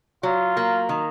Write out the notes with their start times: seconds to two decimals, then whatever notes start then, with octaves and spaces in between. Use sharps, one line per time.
0.23 F#3 F4
0.57 A#3
0.89 D#3